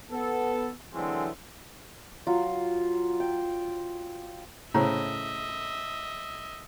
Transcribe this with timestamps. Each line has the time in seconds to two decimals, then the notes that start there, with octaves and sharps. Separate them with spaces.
0.11 B3 A4
0.94 D3 E3 F#3 G#3 A3 C4
2.27 F#3 F4
3.20 G5
4.74 A2 C#3 C5 D#5 E5 A#5